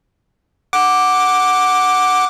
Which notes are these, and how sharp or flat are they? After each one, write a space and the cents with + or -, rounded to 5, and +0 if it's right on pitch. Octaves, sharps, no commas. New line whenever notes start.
F#5 +0 D6 +0